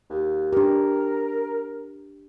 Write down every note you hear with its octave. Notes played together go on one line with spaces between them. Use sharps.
D#2
D4 G4 A#4